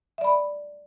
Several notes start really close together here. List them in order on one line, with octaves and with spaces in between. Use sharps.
E5 D5 B5